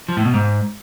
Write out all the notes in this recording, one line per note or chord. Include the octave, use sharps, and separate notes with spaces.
F3
A2
B2
G#2